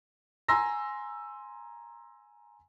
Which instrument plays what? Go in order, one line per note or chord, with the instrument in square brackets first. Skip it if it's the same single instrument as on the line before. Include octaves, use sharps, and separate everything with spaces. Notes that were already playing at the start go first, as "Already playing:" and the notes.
[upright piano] G#5 A#5 C6 E6 A#6